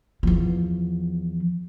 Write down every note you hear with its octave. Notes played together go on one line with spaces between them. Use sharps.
E2 F3